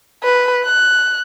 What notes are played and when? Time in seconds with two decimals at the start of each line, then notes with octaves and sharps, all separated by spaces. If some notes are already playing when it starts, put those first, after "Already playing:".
0.24 B4
0.66 F#6